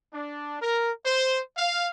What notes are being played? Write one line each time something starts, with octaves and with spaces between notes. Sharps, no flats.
D4
A#4
C5
F5